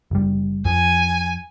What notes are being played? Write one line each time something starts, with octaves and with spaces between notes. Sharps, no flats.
F#1 G3
F2 F3 G#5